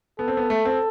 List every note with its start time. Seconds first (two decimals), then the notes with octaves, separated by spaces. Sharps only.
0.19 B3 A4
0.28 C4
0.37 B3
0.50 A3
0.65 C4